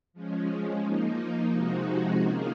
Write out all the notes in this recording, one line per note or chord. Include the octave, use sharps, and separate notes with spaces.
F3 G#3 C#4
F3 A#3 D#4
C3 F3 G#3 D#4 F#4
D#3 A#3 C#4 F4 G#4